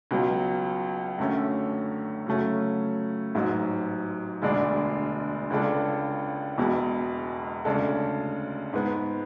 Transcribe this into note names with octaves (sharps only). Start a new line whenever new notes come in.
C#2 B2 F#3
F#2 D3 A3 C#4
C#3 F#3 A3 C#4
A1 G#2 F#3
E1 D2 D3 G#3 D4
C#2 C#3 G#3 D4 A4
E1 E2 B2 G#3
D2 C#3 G#3 D4 A4
G#2 G#3 B3